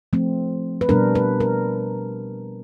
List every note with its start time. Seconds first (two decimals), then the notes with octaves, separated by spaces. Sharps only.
0.13 F3 A3 C4
0.81 B4
0.89 B2 G3 B3 D4 A#4
1.15 B4
1.40 A#4